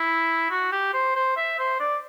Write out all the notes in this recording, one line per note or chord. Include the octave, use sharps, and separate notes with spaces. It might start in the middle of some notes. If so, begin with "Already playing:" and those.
Already playing: E4
F#4
G4
C5
C5
E5
C5
D5